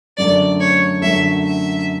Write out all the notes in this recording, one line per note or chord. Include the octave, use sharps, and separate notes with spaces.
F#2 D3 A3 D5
C#5
F#2 D3 A3 E5
E5